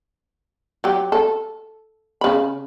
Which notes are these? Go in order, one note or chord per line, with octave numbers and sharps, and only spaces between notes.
F#3 G4
A4
C#3 B5